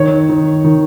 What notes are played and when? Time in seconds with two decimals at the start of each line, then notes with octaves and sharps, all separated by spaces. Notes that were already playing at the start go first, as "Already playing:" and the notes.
Already playing: D#3 C#5
0.29 D#3
0.64 D#3